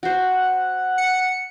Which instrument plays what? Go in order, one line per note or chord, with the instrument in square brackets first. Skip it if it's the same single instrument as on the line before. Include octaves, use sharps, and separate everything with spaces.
[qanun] F#4 C5 [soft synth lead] F#5
[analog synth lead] C#7